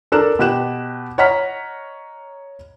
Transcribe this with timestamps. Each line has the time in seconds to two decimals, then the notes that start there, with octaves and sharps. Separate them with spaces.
0.12 D4 A4 A#4 F#6 E7
0.39 B2 G4 F#6 E7
1.18 C#5 D#5 F#5 A#5 F6 B6